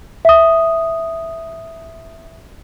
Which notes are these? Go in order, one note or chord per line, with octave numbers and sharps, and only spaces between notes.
E5 D#6